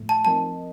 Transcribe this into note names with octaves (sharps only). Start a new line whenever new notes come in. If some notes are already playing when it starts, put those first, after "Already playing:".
Already playing: A2 F3 A3
A5
F3 C4 D#4 A#4 D#5 A5